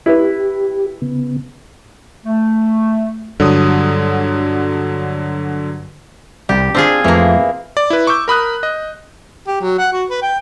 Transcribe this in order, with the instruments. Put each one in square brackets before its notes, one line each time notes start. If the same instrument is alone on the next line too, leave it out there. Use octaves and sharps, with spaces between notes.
[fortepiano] E4 B4 [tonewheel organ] G4
[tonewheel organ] C#3 B3
[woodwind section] A3
[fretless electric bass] G2 [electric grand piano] D3 F#3 D#6
[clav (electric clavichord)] C2 G3 D5 [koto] G4
[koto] C4 F4 G#4 [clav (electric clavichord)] D4
[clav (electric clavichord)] F2 F3 A3 [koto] E3 A#3
[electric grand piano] D5
E4 B4
C#6 D6 E6 G6
A#4 B5 D#6 F#6
D#5
[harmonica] G4
F#3
F#5
F#4
B4
G5